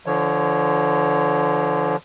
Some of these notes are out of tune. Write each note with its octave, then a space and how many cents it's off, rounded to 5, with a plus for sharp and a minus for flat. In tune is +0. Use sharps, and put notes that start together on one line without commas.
D3 -5 F3 -30 C#5 +0